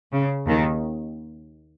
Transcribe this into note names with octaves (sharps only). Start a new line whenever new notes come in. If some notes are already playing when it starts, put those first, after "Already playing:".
C#3
D#2 D#3